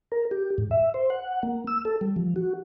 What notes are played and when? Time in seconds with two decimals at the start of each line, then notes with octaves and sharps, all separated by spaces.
0.12 A#4
0.31 G4
0.58 G#2
0.71 E5
0.94 C5
1.10 F#5
1.43 A#3
1.67 E6
1.85 A4
2.01 G3
2.16 F3
2.36 F#4